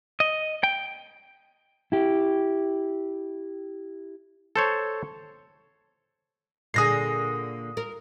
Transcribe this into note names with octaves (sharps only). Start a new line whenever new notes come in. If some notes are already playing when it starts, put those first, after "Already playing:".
D#5
G5
E4 G4
A4 C5 C#5
A#2 D3 G#4 D#6 A#6 C7
A#4